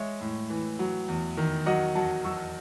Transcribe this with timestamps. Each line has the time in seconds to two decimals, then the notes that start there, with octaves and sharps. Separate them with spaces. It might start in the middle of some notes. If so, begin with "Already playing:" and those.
Already playing: G#3 C#5 E5
0.21 A2
0.50 E3
0.79 F#3
1.08 E2
1.37 D#3
1.66 F#3 D#5 F#5
1.95 F#3 F#5 A5
2.24 F#3 C#6 E6